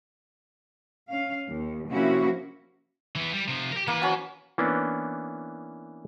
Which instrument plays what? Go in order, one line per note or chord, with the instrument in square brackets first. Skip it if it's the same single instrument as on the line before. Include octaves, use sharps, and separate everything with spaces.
[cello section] C#4 F5
D#2
C3 F3 A#3 C#4 E4 F#4
[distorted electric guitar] E3 B3
G3
C3 F3
G4 A#4
[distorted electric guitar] E3 B4 [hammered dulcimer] A#3
[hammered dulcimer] C#4 F#4
[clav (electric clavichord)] E3 A#3 B3 C#4 D4